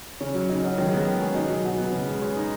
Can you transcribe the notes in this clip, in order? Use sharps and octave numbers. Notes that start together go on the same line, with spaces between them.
C#3 C#4
F#3
C#3 D#4
C#4 F#4
D#3 F#3
G#3
F#3 B3
D#3
C#4 G#4
B2 D#4
F#3
B2 F#4
B3
C#3
G#3
G#4 C#5
D#4